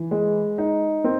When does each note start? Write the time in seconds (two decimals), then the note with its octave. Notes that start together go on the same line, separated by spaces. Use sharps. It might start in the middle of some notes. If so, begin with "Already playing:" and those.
Already playing: E3
0.11 G#3
0.58 D#4
1.04 C4